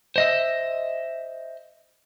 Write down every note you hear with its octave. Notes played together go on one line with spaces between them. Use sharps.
C5 D#5 E5